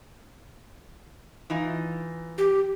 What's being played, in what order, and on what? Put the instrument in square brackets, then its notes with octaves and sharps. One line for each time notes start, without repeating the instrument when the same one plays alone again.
[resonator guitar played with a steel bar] E3 D#4 F4
[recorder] G4